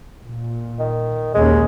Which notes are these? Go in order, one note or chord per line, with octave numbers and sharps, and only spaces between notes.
A#2
D#3
A#1 D#2 G#3 C#4